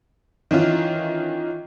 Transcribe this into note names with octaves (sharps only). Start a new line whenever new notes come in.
D#3 E3 C#4 F4